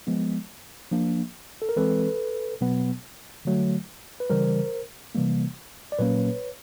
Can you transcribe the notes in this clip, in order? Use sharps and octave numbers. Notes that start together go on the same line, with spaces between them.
F3 G#3 B3
F3 A#3 D4
A4
A#4
E3 G#3 C4 A4 B4
B2 F#3 B3
D3 F#3 A3
B4
C#3 E3 G3 A#4 C5
C3 E3 G3 A#3
D5
A#2 F#3 A#3 C#4 B4 C#5